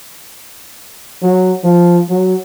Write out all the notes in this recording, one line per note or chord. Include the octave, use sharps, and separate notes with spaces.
F#3
F3
F#3